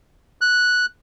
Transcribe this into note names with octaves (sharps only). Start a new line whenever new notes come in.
F#6